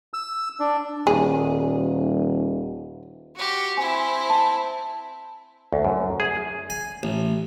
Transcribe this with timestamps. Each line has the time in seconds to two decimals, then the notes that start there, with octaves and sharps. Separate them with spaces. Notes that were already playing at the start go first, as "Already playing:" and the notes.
0.14 E6
0.60 D4
1.07 D#1 G#4
3.36 F#4 G4
3.77 C4 E4 G#5
4.30 A5
5.73 D2
5.85 F#2
6.20 G#4
6.70 G#5
7.03 A1